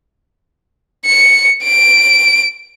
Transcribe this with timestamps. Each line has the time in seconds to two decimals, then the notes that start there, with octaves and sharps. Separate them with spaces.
1.06 C#7
1.64 D7